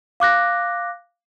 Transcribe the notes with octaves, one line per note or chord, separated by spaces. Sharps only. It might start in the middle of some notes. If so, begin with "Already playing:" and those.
F5 D6 F#6 A#6